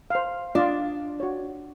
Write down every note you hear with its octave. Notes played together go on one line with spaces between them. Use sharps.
C5 F5
D4 F4 D5 D#5
F#4 C#5